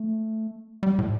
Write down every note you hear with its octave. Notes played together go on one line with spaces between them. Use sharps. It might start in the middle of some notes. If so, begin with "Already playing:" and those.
Already playing: A3
G3
A2